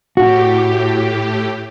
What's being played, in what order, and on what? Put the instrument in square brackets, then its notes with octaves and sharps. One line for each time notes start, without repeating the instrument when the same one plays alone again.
[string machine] A2 G4 [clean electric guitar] F#4